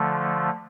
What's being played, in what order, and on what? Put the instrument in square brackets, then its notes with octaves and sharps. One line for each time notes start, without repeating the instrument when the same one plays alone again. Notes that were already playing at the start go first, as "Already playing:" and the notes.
Already playing: [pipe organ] D3 F3 A3